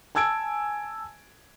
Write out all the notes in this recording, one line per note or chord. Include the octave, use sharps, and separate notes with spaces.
G#5 A5 E6 G#6 D7